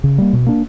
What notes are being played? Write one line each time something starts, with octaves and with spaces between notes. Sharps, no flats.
C#3
G3 A#3
B2
A#3 D4